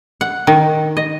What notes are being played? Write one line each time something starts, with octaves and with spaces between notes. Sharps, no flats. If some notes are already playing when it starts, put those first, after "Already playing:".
F#5
D#3
D#5